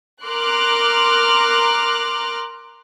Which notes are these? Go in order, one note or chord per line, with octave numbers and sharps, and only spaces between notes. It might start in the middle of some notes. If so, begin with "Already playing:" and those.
A#4 A#5 C6 D6 F6 F#6